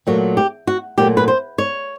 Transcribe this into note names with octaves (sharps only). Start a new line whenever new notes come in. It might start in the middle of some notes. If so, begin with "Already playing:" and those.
A#2 F#3 A3 F#4
G4
F#4
A#2 F#3 A3 G4
B4
C5
C#5